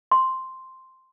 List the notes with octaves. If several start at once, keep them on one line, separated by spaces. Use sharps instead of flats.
C6